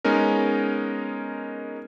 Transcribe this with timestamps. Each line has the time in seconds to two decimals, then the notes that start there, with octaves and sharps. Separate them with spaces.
0.05 G#3 B3 C#4 D#4 A#4